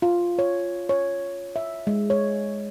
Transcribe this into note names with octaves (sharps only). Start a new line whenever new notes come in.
F4
C#5
C#5
E5
G#3
C#5